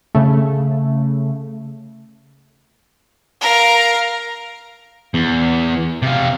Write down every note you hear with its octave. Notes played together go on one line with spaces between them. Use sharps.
C#3 A3
A#4 F5
E2
C3 F5